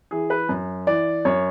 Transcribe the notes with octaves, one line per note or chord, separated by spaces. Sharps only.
E3 G#4
B4
F#2
E3 D5
F#2 C#5